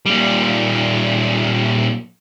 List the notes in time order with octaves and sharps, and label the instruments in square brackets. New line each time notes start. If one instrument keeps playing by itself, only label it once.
[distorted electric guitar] A#2 G3